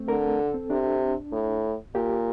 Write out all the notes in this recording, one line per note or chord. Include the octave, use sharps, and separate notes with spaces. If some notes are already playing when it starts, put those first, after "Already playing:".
Already playing: A3 C4
D3 A#4
A4
C4
C3 D4
A2
A#2 G4